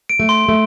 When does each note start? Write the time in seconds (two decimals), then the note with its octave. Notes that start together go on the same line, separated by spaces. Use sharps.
0.09 D7
0.19 A3
0.29 C6
0.49 A3